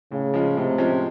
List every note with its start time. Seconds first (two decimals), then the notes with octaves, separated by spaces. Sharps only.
0.12 A2 C#3
0.34 F3 G#3 C#4
0.57 A2 C3
0.78 F3 G#3 C#4